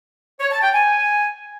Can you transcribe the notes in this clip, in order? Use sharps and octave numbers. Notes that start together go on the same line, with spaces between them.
C#5
A5
G5
G#5